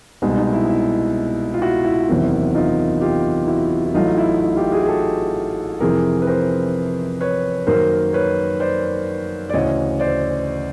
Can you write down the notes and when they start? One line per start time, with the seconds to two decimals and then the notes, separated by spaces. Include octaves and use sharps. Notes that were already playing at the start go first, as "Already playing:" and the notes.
0.22 C2 B2 G#3 D#4
0.38 D#4
0.53 E4
0.69 E4
1.54 F4
1.62 E4 F#4
1.85 E4
2.09 F#1 E2 C3 D#3
2.55 D#4 F4
3.01 F4 G4
3.47 E4 F#4
3.86 E4
3.94 A1 A2 F#3 A3 D#4 F4
4.18 E4
4.41 D#4
4.56 F4 G4
4.72 F#4 G#4
4.82 G#4
4.87 G4 A4
5.80 F2 C3 E3 G#4 A#4
6.22 B4
6.27 A#4 C5
7.21 B4 C#5
7.67 F#2 D#3 F#3 A#3 A#4 C5
8.13 B4 C#5
8.60 C5 D5
9.50 D5
9.53 D2 C#3 E3 C#5 D#5
10.00 C5 D5